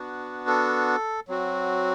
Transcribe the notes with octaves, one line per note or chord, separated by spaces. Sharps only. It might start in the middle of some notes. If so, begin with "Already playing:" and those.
Already playing: B3 D4 F#4
A4
F#3 C4 F#4